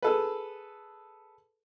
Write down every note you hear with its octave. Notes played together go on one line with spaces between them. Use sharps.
G#4 A4 B4